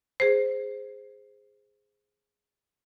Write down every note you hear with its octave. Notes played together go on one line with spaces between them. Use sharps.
G#4 C5